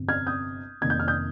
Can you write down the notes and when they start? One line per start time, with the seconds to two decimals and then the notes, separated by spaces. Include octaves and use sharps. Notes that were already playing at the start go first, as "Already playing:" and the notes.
Already playing: G1 F2 C3
0.09 F6 G#6
0.27 D#6 G6
0.81 F1 F2 D#3 A#3 G#6
0.90 G6
1.00 F6
1.08 D#6 G6